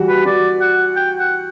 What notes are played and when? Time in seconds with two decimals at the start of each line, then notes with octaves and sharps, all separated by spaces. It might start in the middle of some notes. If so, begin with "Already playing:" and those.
Already playing: E3 G3 F#4
0.09 B4
0.25 F#4 D5
0.61 F#5
0.96 G5
1.19 F#5